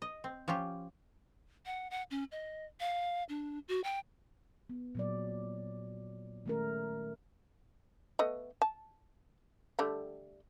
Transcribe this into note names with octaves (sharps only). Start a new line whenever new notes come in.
D#5
C4
F3 C#4 F4 G4
F#5
F#5
C#4
D#5
F5
D4
F#4
G5
B3
A#2 F#3 D5
D#3 G#3 A3 C#4 A#4
A3 B3 D#5
A5
D3 G3 A3